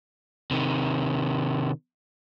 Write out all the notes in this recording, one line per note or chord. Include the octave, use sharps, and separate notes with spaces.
C3 D#3